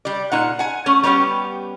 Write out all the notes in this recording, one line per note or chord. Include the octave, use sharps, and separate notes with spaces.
G3 D5
A#2 D#4 F#5
F#5 G#5
A3 C#4
G3 B3 C#4 G4